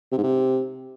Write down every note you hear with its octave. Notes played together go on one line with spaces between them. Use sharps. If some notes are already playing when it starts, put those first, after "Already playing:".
C3
G#2
C3